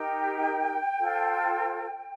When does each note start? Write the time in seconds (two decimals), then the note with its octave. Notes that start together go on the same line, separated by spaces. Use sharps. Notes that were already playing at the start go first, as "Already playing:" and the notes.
Already playing: D#4 G4 A#4 G5
0.99 F4 A4 C5